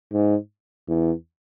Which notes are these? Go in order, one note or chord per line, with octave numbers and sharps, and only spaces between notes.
G#2
E2